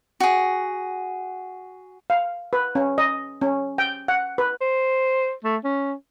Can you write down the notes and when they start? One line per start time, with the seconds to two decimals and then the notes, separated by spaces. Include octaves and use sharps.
0.20 F#4 G#4
2.10 F5
2.53 B4
2.75 C#4
2.98 D#5
3.41 C#4
3.78 G5
4.08 F#5
4.38 B4
4.61 C5
5.44 A3
5.64 C#4